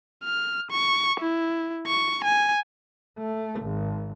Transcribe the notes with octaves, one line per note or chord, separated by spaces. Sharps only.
F6
C#6
E4
C#6
G#5
A3
G#1